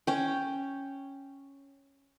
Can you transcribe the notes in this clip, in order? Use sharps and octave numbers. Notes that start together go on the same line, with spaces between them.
C#4 G5